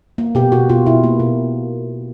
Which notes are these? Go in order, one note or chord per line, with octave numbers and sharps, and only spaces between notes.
A#3
B2 G4
B2 F#4
B2 F4
B2 E4
A#3
B2